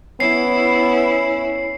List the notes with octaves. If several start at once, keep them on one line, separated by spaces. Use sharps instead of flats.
B3 C#4 E4 C7